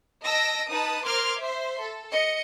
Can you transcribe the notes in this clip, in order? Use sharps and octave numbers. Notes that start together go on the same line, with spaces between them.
D#5 A5 E6 A#6 D7
D#4 B4 A5 D#6
A#4 C5 C6 D6 F6 G#6
C5 E5 C6
A4
D#5 C#7